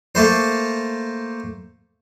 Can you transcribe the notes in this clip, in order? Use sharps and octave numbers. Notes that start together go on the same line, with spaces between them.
A3 A#3 C5